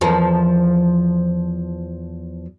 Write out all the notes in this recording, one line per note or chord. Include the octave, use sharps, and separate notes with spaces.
E2 F3 A#4